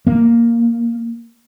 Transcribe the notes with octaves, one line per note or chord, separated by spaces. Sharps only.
A#3